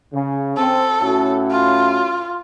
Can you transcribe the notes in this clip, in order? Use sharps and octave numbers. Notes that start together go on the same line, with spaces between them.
C#3
C4 A4
A2 C#4 F#4
F4